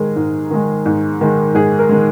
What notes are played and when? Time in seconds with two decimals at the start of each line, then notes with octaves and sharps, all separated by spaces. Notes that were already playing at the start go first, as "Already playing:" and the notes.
Already playing: G#2 D#3 G#3 G#4 A#4
0.16 G#2
0.51 D#3 G#3
0.86 G#2
1.21 D#3 G#3
1.55 G#2 G#4
1.79 A#4
1.89 D#3 G#3